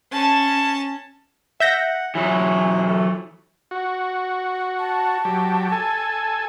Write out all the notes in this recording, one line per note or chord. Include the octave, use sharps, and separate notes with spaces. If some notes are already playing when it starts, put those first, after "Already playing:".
C#4 A5
E5 F#5 G6 A#6
E3 F#3 C#4 E4 G#4
A3 A4
F#4
A5
F#3 G4
A4 G#5